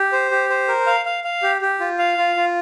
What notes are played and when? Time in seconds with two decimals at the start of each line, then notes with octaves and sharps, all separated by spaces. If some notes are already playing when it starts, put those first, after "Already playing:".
Already playing: G4
0.12 C5
0.31 G4
0.50 C5
0.68 A#4
0.87 F5
1.05 F5
1.24 F5
1.43 G4
1.61 G4
1.80 F4
1.99 F5
2.18 F4
2.36 F4